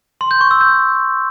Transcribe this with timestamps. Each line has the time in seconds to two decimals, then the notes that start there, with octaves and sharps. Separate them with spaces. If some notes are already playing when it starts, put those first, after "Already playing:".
0.21 C6
0.31 G6
0.41 C#6
0.51 E6
0.61 G6